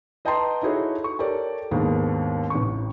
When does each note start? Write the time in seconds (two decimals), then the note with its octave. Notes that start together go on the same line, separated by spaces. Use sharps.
0.25 B4 D#5 G5 A5 A#5 C6
0.62 D#4 E4 F#4 G#4 A4 C#5
1.04 C#6
1.19 G4 A4 A#4 C#5 D5
1.71 D#2 G#2 G#3 A#3 B3 D4
2.50 A1 C3 C#6